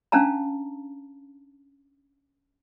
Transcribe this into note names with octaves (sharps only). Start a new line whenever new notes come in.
C#4 D4 F5 A5 A#5